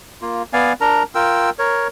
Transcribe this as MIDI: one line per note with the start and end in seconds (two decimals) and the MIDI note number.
0.22 0.43 58
0.22 0.43 65
0.53 0.73 59
0.53 0.73 74
0.53 0.73 77
0.53 0.73 80
0.81 1.03 62
0.81 1.03 70
0.81 1.03 82
1.15 1.50 65
1.15 1.50 70
1.15 1.50 79
1.15 1.50 88
1.59 1.88 70
1.59 1.88 73